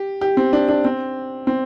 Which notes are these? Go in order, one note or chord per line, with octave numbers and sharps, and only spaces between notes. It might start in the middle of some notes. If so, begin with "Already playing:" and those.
Already playing: G4
G4
C4
D4
D4
C4
C4